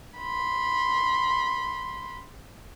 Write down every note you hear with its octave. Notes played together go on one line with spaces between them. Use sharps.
B5 C6